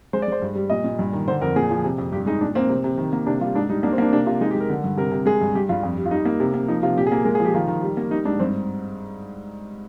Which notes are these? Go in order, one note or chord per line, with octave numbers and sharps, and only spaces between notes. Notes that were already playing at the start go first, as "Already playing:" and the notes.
G#3 C5
D5
G#3 C5
G2
G3
A#2 D#5
A#2
G2
D#3
D3 C5
F2 A#4
A#2 G#4
F3
C3
F2
G2 G4
G#3 D#4
A#2 D4
A#3 C4
C3
C3
D#3
A#3
C3 D4
G3 F4
G#2 D4
G3 D#4
A#3 D4
C4
A#3 D4
C3 D4
C3 F4
G#3 D#4
G4
G#3
A#4
D3
G2
C3 A#4
C3
G#3 G#4
G2
G2 G4
G2 F4
F2
G3
F4
G3 D#4
A#3
C3
A#3
F3 D#4
C3 F4
A#2 G4
G#4
A#3
G#3 A#4
G#4
F3 G4
D#3 F4
D#3
G3
A#3
G3 D#4
G#2 D4
G2 C4